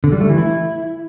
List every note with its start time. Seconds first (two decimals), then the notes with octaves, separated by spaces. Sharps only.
0.04 D3
0.12 G3
0.21 A3
0.29 E3
0.38 E4